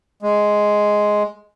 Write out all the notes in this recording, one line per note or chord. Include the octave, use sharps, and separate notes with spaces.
G#3